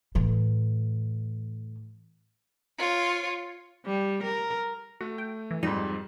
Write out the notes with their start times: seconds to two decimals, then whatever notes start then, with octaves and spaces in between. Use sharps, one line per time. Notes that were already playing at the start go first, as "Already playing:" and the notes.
0.15 A2 E3
2.78 F4 C#5
3.86 G3
4.23 A#4
5.01 A3 F#4
5.18 G5
5.51 E3
5.63 F2 G#2 G3 D#4